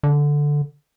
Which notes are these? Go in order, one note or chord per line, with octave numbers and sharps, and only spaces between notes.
D3